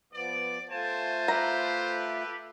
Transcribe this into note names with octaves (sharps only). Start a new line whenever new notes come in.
F3 B3 D5
A3 F4 C5 G#5 A5
G4 A4 B4 A#5